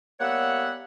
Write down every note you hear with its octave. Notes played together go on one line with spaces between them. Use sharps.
G3 A#3 B3 C#5 E5 F#5